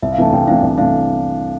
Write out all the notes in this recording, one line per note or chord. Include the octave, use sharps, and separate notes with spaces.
C2 E5
F5
C3 E3 A3 D4 A5
C2 G5
C3 E3 A3 D4 F5
C2
C3 E3 A3 D4 F5